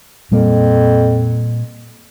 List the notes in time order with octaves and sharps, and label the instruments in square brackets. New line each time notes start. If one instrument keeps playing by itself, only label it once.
[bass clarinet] F2 [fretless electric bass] A#2 G3 A#3